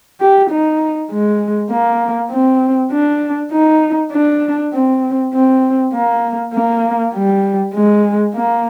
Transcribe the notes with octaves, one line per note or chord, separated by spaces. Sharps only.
G4
D#4
G#3
A#3
C4
D4
D#4
D4
C4
C4
A#3
A#3
G3
G#3
A#3